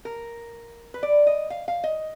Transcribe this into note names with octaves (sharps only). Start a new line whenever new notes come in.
A#4
B4
D5
D#5
F5
F5
D#5